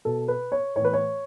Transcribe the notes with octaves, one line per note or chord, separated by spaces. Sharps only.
B2 A4
B4
C#5
A2 E3 B4 C#5
C#5